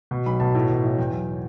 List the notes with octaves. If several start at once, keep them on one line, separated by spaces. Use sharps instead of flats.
B2
B1 B5
B2 A5
A2
A1
E3
E2 G5
F#3